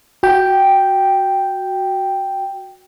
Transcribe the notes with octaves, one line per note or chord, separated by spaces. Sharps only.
F#4 G5